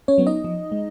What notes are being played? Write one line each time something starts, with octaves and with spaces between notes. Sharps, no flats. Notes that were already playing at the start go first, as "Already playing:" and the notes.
C#4 C#5
F#3 B3
D#4 D#5
F3
G#3